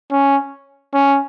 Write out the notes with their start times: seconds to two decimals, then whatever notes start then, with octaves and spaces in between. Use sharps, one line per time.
0.12 C#4
0.94 C#4